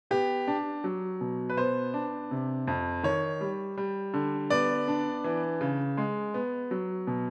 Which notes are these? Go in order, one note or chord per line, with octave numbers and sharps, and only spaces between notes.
B3 G4
D4
F#3
B2
B4
B3 C5
D4
C3
F2
D#3 C#5
G3
G3
D3
B3 D5
D4
E3
C#3
G#3
B3
F#3
B2